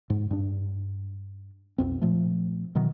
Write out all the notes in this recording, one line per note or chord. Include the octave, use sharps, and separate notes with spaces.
G#2
G2 D4
B1 F2 C4
A#2 F3 A3
B2 D#3 E3 F#3